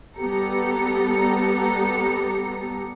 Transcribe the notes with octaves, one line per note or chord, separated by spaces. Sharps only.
G3 B3 G4 A4 A#5 C#7